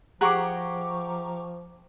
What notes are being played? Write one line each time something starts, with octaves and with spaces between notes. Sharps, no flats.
F3 G4 G#4 F#5 A#5 C#6 D6